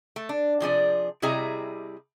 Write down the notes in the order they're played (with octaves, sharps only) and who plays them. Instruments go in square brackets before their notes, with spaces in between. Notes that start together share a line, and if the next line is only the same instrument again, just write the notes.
[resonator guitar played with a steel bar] A3
D4
C3 F3 G#4 D5
C3 G3 E4 G#4 D#5 A#5